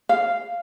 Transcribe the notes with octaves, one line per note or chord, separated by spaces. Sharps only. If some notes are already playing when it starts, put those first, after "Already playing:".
F5